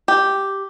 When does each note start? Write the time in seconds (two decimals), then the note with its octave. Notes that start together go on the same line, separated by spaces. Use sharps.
0.08 G4